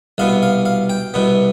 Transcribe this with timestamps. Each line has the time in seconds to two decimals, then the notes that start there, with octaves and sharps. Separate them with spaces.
0.18 C2 B2 B3 F5
0.43 F5
0.66 F5
0.90 G5
1.14 C2 B2 B3